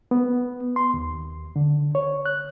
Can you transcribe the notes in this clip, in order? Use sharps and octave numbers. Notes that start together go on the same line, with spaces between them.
B3
C6
D#2
D3
C#5
F#6